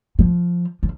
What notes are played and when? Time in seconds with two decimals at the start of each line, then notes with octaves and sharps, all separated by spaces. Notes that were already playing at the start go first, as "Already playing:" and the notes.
0.19 F3
0.83 F3